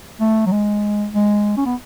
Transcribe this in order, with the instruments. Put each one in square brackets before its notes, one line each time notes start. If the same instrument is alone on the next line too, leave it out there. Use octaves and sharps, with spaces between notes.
[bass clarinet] A3
F#3
G#3
G#3
C#4
B3